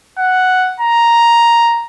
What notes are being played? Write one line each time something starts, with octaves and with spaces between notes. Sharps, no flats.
F#5
A#5